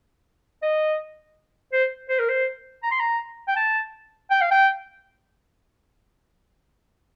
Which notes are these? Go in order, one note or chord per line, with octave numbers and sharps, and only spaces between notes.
D#5
C5
C5
A#4
C5
A#5
C6
A#5
G5
A5
G5
F5
G5